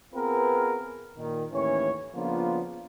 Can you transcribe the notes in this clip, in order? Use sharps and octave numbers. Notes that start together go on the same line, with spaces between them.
B3 C4 F4 G#4 A#4 B4
A#2 D#3
D#2 A2 E3 C#4 C#5
C#3 F3 A#3 B3 D4 F4